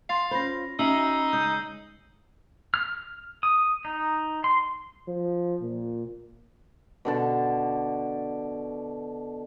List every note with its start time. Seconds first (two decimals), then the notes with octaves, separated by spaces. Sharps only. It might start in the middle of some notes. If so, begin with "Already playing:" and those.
0.09 F5 C6 A6 C7
0.31 C#4 F4 C5 B5 A#6
0.79 C#4 D#4 F#4 E5 E6 C7 F#7
1.33 C#3 G#3 G6
2.74 F6
3.43 D#6
3.85 D#4
4.44 C6
5.08 F3
5.62 A#2
7.05 B2 D3 A5